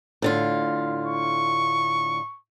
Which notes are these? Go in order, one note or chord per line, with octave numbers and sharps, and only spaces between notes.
A2 D3 F4
C#6